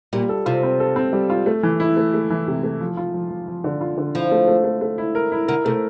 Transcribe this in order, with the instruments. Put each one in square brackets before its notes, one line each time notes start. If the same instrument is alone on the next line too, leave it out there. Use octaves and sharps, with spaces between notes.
[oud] A#2 [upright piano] G3
[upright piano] A4
[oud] C3 [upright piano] F4
[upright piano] C4
A4
C4
G3
F4
A3
E3
E4
A3
A3
E3
C3
A3
F3
F4
F3
F3
F3
D3
F4
D3
[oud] F3 [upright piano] E4
[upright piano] A3
A3
A3
A3
E4
A#4
E4
[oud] D3 [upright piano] A#4
[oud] C3 [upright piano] A3